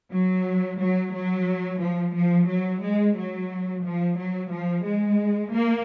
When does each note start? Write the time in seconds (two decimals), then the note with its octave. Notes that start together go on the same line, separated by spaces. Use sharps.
0.12 F#3
0.80 F#3
1.14 F#3
1.81 F3
2.15 F3
2.48 F#3
2.82 G#3
3.16 F#3
3.84 F3
4.17 F#3
4.51 F3
4.85 G#3
5.53 A#3